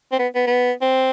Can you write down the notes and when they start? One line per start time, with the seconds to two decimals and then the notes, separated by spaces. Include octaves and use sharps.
0.12 C4
0.19 B3
0.35 B3
0.47 B3
0.82 C4